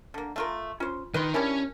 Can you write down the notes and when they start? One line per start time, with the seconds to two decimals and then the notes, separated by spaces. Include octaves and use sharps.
0.14 D3 A#3
0.36 A3 F4 A#4
0.80 C#4 F4 C5
1.14 D#3 B4 D#5 C6
1.34 G3 C#4 D4 E4 A#4 G#5